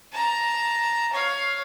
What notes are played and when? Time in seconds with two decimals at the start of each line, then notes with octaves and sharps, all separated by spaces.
0.13 A5 A#5
1.13 C#5 F5